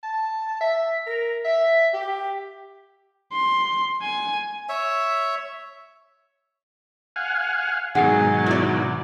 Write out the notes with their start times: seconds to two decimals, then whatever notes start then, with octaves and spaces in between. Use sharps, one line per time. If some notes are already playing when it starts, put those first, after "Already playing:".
0.03 A5
0.61 E5
1.07 A#4
1.45 E5
1.93 G4
3.33 C6
4.02 G#5
4.69 C#5 E5
7.16 F5 F#5 G#5
7.95 G#2 B2 D#3 F#3 G#4 F#5
8.46 E4 D5